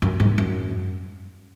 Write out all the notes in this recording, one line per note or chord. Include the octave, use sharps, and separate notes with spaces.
F#2
G#2
F#2